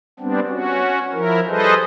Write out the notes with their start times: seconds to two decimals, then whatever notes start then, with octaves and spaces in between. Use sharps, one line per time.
0.20 G3 B3 C4 D4
0.49 C#4 F#4
1.12 F3 E4 A#4
1.48 G3 G#4 A4 B4 C5 D#5